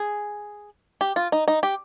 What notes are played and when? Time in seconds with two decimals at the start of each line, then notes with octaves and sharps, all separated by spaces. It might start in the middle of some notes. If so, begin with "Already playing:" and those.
Already playing: G#4
1.01 G4
1.16 F4
1.32 D#4
1.48 D#4
1.63 G4